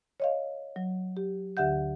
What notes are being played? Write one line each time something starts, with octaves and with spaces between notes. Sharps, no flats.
C#5 D#5 F5
F#3
G4
D2 D3 G4 E5 F#5 G6